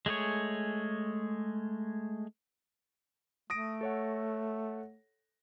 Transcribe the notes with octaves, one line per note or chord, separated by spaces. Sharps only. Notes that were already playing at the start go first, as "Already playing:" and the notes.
G#3 A3 G#4 C#5
A3 D#6 A#6 D7
A4 C#5 F#5